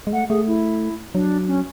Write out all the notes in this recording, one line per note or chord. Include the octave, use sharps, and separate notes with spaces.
G#3
A3 F#5
A3 G#4
E4
F#3 D4
C#4